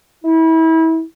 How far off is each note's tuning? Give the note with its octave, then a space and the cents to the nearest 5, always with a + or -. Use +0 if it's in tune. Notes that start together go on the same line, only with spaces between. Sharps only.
E4 -30